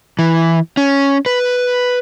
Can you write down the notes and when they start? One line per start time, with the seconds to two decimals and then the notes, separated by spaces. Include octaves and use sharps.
0.19 E3
0.77 C#4
1.26 B4